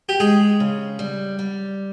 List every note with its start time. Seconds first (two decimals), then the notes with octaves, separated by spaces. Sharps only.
0.09 G4
0.20 G#3 G#4
0.60 C#3
0.99 G3
1.39 G3